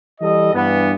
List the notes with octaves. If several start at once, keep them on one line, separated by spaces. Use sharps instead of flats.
E3 G3 G4 A4 D#5
G2 E3 B3